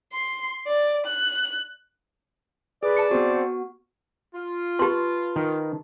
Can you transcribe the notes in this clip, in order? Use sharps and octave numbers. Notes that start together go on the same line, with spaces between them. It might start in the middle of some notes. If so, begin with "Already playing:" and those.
C6
D5
F#6
G#4 B4 D5
A5 C#7
B3 C4 F#4
F4
G4 B4 A5 C6
D#3